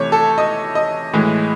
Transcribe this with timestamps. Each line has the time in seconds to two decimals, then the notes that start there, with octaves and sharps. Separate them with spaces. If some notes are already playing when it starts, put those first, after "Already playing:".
Already playing: C3 E3 A3 C#5
0.12 A4
0.38 D#5
0.75 D#5
1.13 A2 E3 G#3